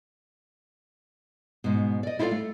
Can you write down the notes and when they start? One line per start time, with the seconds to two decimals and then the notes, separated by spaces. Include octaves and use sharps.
1.64 G#2 B2
2.03 D5 D#5
2.19 E4 F4 A4 A#4 D5 F5
2.31 A3